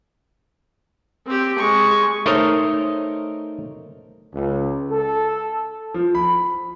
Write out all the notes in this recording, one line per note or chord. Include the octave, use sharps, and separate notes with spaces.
C4 G4
G#3 C#6
A3 D#4 A#4 C5 C#5 D#5
C#2
A4
F3
B5